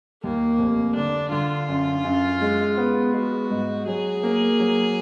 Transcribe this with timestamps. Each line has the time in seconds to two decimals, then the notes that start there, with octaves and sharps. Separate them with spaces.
0.23 D#2 A#3
0.59 F1
0.95 D3 D4
1.32 D3 F4
1.69 F#2
2.04 F#2
2.41 G#3
2.77 B3
3.14 G#3 F#4
3.50 G#2
3.86 F#3 G#4
4.23 A#3
4.59 F#3